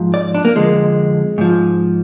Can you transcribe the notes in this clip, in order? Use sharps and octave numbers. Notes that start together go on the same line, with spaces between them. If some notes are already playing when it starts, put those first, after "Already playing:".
Already playing: G#2 F3
D5
D4
A#3
F2 D3 F3 G#3
G#2 F3